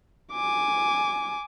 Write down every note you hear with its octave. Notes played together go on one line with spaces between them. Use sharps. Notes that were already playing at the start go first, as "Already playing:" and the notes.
G#5 D6